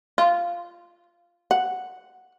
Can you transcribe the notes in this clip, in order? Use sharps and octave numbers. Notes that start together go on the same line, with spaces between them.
F4
F#5